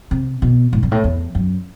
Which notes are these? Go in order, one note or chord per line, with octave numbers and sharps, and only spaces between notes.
C3
B2
A2
G2
A2
E2
F#2